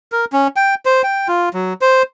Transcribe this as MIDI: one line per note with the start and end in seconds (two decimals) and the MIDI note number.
0.12 0.25 70
0.33 0.47 61
0.56 0.75 79
0.86 1.02 72
1.04 1.28 79
1.28 1.49 65
1.54 1.73 54
1.81 2.03 72